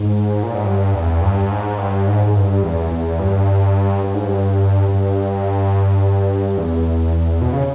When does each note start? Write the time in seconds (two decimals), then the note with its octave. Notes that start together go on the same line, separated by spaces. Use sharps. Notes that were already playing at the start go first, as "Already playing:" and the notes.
Already playing: G#2
0.43 A#2
0.54 G#2
0.65 G2
0.94 E2
1.22 G2
1.51 G#2
1.78 G2
2.07 G#2
2.26 G#2
2.35 G2
2.63 E2
2.91 E2
3.20 G2
4.04 G2
4.14 G#2
4.25 G2
4.89 G2
6.57 E2
7.42 B2
7.53 C#3